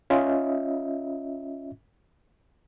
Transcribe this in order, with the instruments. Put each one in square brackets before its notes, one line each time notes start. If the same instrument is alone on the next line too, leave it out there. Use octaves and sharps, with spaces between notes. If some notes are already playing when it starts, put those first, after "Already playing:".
[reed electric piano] C#4 F4 D#5 E5